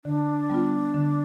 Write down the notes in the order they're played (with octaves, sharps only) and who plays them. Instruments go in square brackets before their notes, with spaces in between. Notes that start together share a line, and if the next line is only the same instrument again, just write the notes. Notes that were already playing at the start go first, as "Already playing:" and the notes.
[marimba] D3 [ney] D4
[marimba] G3 B3 F4
D3